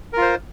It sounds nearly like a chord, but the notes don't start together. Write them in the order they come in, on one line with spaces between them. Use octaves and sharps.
A#4 F4 C5